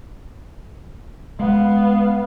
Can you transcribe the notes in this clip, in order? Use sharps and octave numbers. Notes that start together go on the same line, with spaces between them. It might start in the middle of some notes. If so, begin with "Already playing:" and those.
G#3 B3 F5